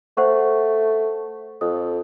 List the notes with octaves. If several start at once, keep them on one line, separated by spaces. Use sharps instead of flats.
A3 C5 F#5 C#6
F2 D#6